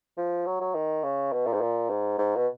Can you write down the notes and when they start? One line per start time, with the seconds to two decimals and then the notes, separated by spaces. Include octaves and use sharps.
0.17 F3
0.46 F#3
0.61 F#3
0.75 D#3
1.03 C#3
1.32 B2
1.46 A#2
1.54 G#2
1.61 A#2
1.90 G#2
2.18 G#2
2.36 B2